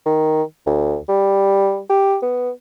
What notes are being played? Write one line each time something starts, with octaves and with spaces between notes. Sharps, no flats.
D#3
D2
G3
G4
B3